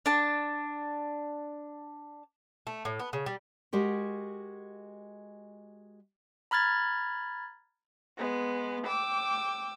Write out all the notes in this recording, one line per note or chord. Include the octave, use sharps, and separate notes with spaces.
D4 A5
A3
A2
B3
C#3
G3
G#3 F#4 G4 A#4
A#5 B5 F6 G#6 A6
G#3 B3
G5 D6 E6